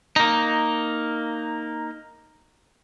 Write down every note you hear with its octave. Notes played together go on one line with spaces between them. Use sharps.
A#3 D#4